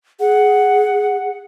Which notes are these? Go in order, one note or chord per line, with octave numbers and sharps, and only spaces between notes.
G#4 F#5